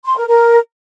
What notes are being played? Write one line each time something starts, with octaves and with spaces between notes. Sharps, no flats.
C6
A#4
A#4